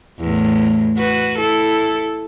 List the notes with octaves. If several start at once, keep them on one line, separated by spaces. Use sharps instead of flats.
E2 A2
F#4 B4
E4 A4